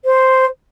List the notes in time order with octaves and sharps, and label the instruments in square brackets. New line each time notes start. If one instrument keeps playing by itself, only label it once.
[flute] C5